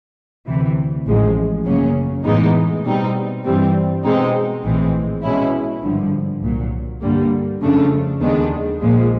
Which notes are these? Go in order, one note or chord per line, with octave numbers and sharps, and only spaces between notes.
D2 C3 E3
A1 A2 F3 G#3
F#2 C#3 F#3 A#3 C#4
A2 E3 G#3 B3 D#4
B2 G3 C4 D#4
G2 E3 G3 C4
B2 G#3 C4 D#4
A#1 A2 E3 G#3 C4
B2 G#3 C#4 E4
G#1 G2 D3 F3
C2 A#2 F#3
G2 D3 G3 A#3
F2 C#3 F3 A3 D4
D#2 D#3 G#3 B3 D4
A#1 A#2 F3 G#3